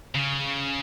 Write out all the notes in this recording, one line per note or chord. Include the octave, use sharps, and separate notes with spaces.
C#3